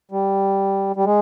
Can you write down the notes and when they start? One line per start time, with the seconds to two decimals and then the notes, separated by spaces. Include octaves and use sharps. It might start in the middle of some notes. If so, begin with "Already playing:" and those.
0.11 G3
0.96 G3
1.05 G#3